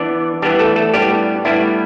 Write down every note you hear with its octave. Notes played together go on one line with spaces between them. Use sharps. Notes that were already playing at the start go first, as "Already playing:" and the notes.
Already playing: E3 B3 D4 D5
E3 G3 B3 D4 G4
A3 A4
A3 A4
A2 G3 B3 D4 G4
A2 G3 B3 D4 E4